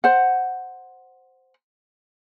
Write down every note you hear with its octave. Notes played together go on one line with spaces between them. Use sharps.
C5 F#5